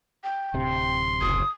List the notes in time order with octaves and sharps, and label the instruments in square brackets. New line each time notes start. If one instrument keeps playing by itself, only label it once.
[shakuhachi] G5
[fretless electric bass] D1 C3 [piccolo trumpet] C6
[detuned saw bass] F#1 [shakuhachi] D#6